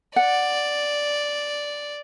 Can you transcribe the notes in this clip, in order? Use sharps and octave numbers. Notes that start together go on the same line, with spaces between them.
D5 F#5